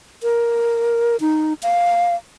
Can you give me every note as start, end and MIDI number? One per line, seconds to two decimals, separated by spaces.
0.23 1.16 70
1.21 1.53 63
1.63 2.15 77